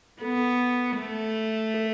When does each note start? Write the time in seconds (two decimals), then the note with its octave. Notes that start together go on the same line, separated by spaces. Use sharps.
0.21 B3 A4
0.98 A3
1.74 A4